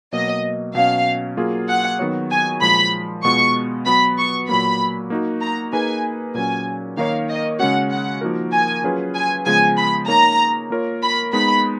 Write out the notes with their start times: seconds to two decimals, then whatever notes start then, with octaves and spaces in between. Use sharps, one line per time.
0.12 B2 F#3 A#3 D#5
0.75 B2 F#3 C#4 F5
1.37 F#3 A#3 F4 G#4
1.68 F#5
1.99 D#3 F#3 B3 F#4 C#5
2.31 G#5
2.61 A#2 F3 G#3 B5
3.23 B2 G#3 B3 F4 C#6
3.86 F#3 B3 F#4 B4 B5
4.18 C#6
4.48 A#2 F#3 A#3 B5
5.10 A#3 D#4 F#4
5.41 A#5
5.73 A#3 D#4 G#4 B4 G#5
6.34 A#2 F#3 C#4 G#5
6.97 D#3 A#3 D#4 A#4 C#5 F5
7.29 D#5
7.59 C#3 G#3 C#4 F#4 F#5
7.90 F#5
8.21 F3 A#3 D#4 F#4 A#4
8.52 G#5
8.84 F#3 C#4 F4 G#4 B4
9.14 G#5
9.46 C#3 F3 G#3 B3 G#5
9.77 B5
10.08 A#3 D#4 A#4 C#5 A#5
10.70 A#3 F4 A#4 C#5
11.02 B5
11.33 G#3 B3 D#4 B5